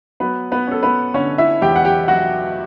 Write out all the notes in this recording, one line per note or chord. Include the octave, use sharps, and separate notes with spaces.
F#3 B3 B4
B3 B4
C#4 A4
B3 B4
D3 C#4 C#5
E4 E5
E2 G4 G5
F#5
G4 G5
F#3 F#4 F#5